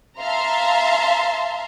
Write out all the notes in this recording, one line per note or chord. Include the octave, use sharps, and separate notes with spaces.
E5 F5 A5 A#5 C6